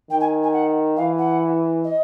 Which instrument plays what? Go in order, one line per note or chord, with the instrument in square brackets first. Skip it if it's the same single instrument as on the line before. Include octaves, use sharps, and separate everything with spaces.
[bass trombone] D#3 [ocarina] G5
[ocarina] G#5
G#5
F#5
[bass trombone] E3 [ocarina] F5
[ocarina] F#5
D#5